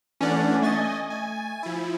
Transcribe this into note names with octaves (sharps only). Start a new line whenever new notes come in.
E3 A3 C#4 D4 D5 F#5
A3 D#5 G#5 C#6 A6
G#5
F3 E4